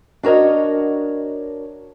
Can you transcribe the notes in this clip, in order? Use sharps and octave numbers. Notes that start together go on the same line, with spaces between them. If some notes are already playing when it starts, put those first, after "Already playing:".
D4 F#4 A#4 C#5 D#5